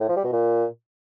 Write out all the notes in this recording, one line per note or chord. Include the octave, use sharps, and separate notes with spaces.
A2
F3
G3
B2
A#2